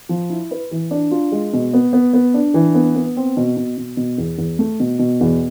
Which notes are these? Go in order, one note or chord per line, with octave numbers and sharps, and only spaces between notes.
F3
E4
B4
E3
D4
F4
G#3
B2
B3
B3
B3
D4
E3
B3
B3
C4
B2
B2
B2
B2
E2
E2
A3
B2
B2
E2